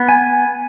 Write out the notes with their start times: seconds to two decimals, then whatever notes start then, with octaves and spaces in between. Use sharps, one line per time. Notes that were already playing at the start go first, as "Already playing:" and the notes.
Already playing: B3
0.09 G#5